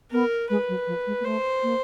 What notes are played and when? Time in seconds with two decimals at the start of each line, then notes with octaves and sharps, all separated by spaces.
0.11 B3 A#4
0.50 G#3 B4
0.69 F#3
0.87 F3
1.07 G#3
1.20 A#3
1.25 A3 C5
1.63 A#3